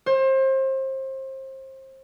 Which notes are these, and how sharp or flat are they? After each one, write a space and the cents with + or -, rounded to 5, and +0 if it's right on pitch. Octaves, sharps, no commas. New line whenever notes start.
C5 +30